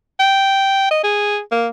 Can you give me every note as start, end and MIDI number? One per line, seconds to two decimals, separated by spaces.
0.20 0.89 79
0.91 1.01 75
1.04 1.40 68
1.52 1.68 58